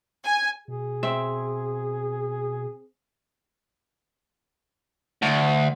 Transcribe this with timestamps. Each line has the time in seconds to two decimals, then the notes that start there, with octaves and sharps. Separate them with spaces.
0.23 G#5
0.68 B2 G#4
1.03 C4 E5
5.22 D2